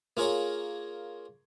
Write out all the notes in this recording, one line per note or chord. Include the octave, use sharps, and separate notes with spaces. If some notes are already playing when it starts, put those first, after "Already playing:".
A#3 F4 G#4 A#4 C#5